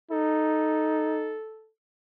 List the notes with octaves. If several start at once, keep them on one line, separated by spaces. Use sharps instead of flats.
D#4 A4